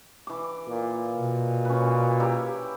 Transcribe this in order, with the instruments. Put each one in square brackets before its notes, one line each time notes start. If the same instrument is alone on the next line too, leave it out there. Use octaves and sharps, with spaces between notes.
[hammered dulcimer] E3 D6
[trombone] A#2
[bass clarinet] B2
[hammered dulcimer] C#4 B4
E4 G4 A#4